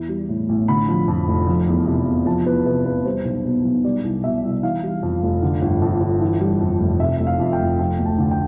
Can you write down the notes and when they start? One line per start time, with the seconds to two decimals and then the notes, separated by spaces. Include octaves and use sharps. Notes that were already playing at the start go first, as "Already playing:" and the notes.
Already playing: E2 E3
0.09 G3
0.29 A2
0.49 A1
0.68 D3 B5
0.88 F3
1.08 F2
1.28 F1
1.47 F3
1.67 E2
1.87 C3
2.06 E2
2.26 F3 A5
2.46 E2 B4
2.66 C3 B4
2.85 E2 B4
3.05 G3 C5
3.25 B1
3.45 B2
3.65 B1
3.84 G3 D5
4.04 C2
4.24 B2 E5
4.44 C2
4.63 E3 F5
4.83 G3
5.03 F2
5.23 F1
5.42 D3
5.62 G1
5.82 F2
6.01 G1
6.21 E3
6.41 G3
6.61 F2
6.81 F1
7.00 C3 E5
7.20 F1
7.27 F5
7.40 F2
7.53 G5
7.60 F1
7.79 F3 G5
7.99 D2
8.05 A5
8.18 D3
8.31 G5